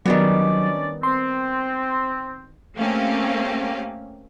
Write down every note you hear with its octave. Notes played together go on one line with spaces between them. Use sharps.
D#3 F#3 G3 B3 C#4 D4 D5
C4 C6
A3 A#3 C4 C#4 G4 F5